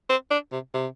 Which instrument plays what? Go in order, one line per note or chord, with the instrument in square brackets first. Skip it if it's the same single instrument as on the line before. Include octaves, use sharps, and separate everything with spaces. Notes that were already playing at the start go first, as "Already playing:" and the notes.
[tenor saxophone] C4
D4
C3
C3